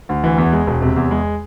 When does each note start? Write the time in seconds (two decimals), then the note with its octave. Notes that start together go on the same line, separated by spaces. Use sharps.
0.09 D2
0.24 E3
0.38 E2
0.52 G#3
0.67 E1
0.82 C3
0.96 E2
1.11 G#3